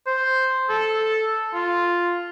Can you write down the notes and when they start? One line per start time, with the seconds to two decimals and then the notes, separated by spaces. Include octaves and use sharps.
0.07 C5
0.69 A4
1.54 F4